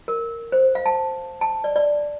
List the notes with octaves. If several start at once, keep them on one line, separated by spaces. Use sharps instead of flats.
A#4
C5
F5
A5
A5
D5
D5